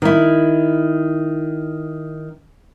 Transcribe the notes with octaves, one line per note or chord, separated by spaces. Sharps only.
D#3 E4